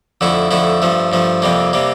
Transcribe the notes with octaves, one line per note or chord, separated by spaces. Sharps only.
F2 D3 A3 E4
F2 D3 A3 E4
G2 F3 A3
G2 F3 A3
F2 C3 G3 A#3
C3 G3 A#3